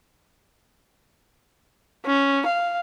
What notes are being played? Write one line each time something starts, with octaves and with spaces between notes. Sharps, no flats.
C#4
F5